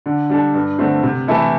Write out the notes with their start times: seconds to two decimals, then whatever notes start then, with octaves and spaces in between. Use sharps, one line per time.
0.06 D3
0.30 G3 D4 A4
0.54 G2
0.79 D3 A3 C4
1.03 C3
1.28 E3 A3 E4 A4